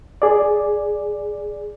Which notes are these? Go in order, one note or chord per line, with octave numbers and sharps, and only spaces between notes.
G#4 D5